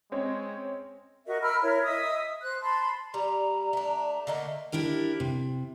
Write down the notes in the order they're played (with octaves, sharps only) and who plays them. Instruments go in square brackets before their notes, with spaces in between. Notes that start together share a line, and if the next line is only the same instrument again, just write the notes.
[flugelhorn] G#3 [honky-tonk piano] C4 C#4 C#5
[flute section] F#4 A#4 D#5 E5
A#4 B5 E6 F6
E4 A#4 C#5
D#5 E5 D#6 E6
C5 F#6
A5 B5 C6
[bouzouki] G3 [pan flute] A#5
[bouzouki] A3 D4
[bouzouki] D3 A3 A#3 [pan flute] D#5
[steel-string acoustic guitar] D4 E4 G4 A#4
C3